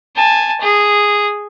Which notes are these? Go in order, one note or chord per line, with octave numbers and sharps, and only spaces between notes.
G#5 A5
G#4